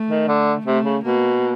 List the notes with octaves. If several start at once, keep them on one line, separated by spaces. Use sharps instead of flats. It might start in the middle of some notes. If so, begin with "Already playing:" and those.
Already playing: A3
D#3
D3
C3 A3
C#3
B2 A#3